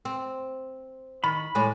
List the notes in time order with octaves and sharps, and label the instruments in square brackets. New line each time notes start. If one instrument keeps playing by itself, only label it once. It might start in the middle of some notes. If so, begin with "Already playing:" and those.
[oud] C4
[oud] D#3 [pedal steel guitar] B5
[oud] A2 G#3 D5